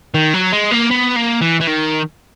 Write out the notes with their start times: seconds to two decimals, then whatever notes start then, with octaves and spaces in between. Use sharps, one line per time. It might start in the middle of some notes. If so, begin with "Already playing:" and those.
0.14 D#3
0.34 F#3
0.53 G#3
0.72 A#3
0.91 B3
1.16 A#3
1.42 E3
1.61 E3
1.67 D#3